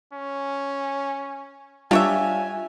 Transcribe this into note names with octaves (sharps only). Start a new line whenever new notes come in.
C#4
G3 D4 F4 C#5 E5 F5 G#5